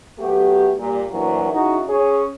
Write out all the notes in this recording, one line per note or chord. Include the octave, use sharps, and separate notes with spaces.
F#3 A3 B3 G4
A#2 G3
D2 A#2 E3 F#3 A#4
C#3 D#4 E4 F#4
C#4 G#4 C#5